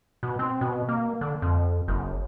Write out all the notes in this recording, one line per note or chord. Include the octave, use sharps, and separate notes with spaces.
B2
C4
B2
A#3
D3
F2
F#1